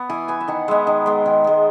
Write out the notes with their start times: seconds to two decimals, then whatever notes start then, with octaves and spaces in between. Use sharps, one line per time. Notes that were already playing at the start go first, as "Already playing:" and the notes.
Already playing: B3
0.10 E3 G#5
0.28 B3 G#5
0.41 E5
0.48 D#3 F#5
0.68 G#3 B3 E5
0.87 D#3
1.06 G#3 B3
1.26 D#3
1.44 G#3 B3